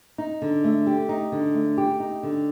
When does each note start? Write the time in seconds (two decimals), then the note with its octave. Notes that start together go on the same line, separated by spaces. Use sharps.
0.18 D#4
0.42 D3
0.64 A3
0.87 G4
1.09 D#4
1.32 D3
1.54 A3
1.78 G4
2.00 D#4
2.23 D3